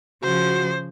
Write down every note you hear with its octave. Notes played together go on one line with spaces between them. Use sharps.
C#3 F3 F#4 C5